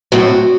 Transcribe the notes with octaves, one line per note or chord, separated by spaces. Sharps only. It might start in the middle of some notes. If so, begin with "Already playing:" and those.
A2 F#3 C4 F#4